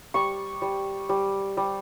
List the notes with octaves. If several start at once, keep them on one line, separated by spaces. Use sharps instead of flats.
G3 C#6
G3
G3
G3